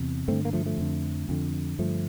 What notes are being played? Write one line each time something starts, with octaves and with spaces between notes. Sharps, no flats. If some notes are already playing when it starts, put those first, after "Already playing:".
Already playing: E2 C3
G2 D3 A3 C4
A#3
F3 A3
F3 A3
F2 D3
F2 D3
G2 D3 F3 A3